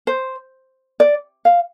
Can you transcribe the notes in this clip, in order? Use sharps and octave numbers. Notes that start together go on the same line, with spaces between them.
C5
D5
F5